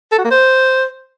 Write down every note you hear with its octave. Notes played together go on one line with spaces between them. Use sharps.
A4
F#4
A#3
C5